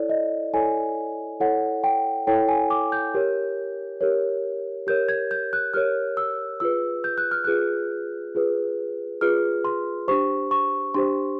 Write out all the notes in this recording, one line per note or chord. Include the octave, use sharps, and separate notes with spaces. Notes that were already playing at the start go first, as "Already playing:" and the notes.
Already playing: E4 A4 C#5 D5
D#5
E4 A4 C#5 G#5
E4 A4 C#5 F#5
G5
E4 A4 C#5 G5
G#5
D6
G6
G4 A#4 C#5
G4 A#4 C#5
G4 A#4 C#5 G6
G#6
G6
F#6
G4 A#4 C#5 F6
E6
F4 G#4 B4 E6
G6
F#6
F6
F4 G#4 B4 F#6
F4 G#4 B4
F4 G#4 B4 F6
C6
D4 G4 C5 C#6
C#6
D4 G4 C5 C6